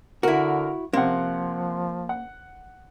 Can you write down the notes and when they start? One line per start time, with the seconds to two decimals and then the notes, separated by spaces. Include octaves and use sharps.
0.23 D3 E4 F#4 A#4
0.93 C3 F3 A#3 F#5
2.09 F#5